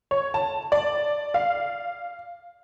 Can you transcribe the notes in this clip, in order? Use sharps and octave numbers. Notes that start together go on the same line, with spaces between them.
C#5
A5
D5
F5